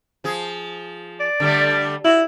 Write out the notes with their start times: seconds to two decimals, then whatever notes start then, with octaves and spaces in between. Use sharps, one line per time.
0.24 F3 G#4
1.20 D5
1.40 D3 G3 A3
2.04 E4 F#4